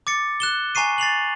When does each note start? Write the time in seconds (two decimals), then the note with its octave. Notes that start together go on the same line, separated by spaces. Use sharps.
0.07 D6 A6 C#7
0.40 F#6 E7 G7
0.75 G#5 A#5 C#6 C7 D#7
0.98 A6 C7 F7 F#7